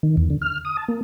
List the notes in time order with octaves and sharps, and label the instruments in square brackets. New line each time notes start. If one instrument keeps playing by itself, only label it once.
[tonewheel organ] D#3
E2
D3
F6
D#6
A5
A#3